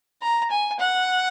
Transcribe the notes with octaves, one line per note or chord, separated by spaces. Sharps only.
A#5
G#5
F#5